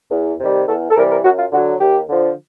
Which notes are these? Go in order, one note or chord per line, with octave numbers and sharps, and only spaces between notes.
E2
C3 D#3 G3
E2 A4
A4
C3 E3 G3 A#4
A#4
F#2 F#4
F4
D3 F#3 F#4
D#2 G4
D3 F3